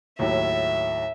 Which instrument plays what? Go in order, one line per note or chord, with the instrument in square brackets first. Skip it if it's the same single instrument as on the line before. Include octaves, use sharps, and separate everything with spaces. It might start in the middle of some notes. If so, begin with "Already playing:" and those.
[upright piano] D#2 A2 F#3 [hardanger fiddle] E5